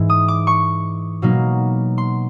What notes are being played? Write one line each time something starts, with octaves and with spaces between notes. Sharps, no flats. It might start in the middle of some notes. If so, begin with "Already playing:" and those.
Already playing: G#2 E3 G#3
D#6
D6
C#6
B2 F#3 A#3 D#4
C6